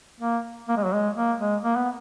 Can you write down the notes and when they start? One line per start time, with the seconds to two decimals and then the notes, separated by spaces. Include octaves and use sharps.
0.21 A#3
0.69 A#3
0.77 G#3
0.85 F#3
0.94 G#3
1.16 A#3
1.39 G#3
1.64 A#3
1.76 B3